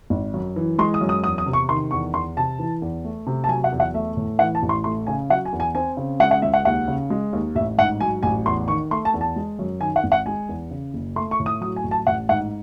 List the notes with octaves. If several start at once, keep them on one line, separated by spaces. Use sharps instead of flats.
G#1
F#2
E3
G#3 C6
D#6
F#2
D#6
E2 D#6
D#6
C3
C#6
D#3 C6
E2 C#6
E2 C6
C3 A5
E3
E2
A3
C3
A5
F#3 G#5
F#5
E2
F#5
A3 E5
A2
E3 F#5
A5
A1
C6
A3 C6
C#3 G#5
F#3 F#5
G#5
E2
G#5
C4 G#5
C#3
G#3 F#5
F#5
C#2 E5
F#5
D#2 F#5
C#3
G#3
D#2
A1 E5
G#2 F#5
F#3 G#5
A1 G#5
E2 C6
D#3 C#6
A3 C6
A5
E2
A5
G#3
F#2
D#3 G#5
F#5
G#1
F#5
G#3 G#5
E2
C#3
F#1
A3 C6
C#6
A2
D#6
F#3 D#6
G#5
A1
A5
A1 F#5
G#2 F#5